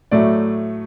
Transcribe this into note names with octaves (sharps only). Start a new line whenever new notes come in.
A2 F#3 A3 D5